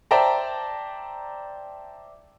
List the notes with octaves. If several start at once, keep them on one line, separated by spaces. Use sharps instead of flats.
C5 D5 E5 G5 A5 A#5